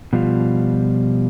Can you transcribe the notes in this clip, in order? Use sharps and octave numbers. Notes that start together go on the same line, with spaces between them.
B2 F3 G3 F4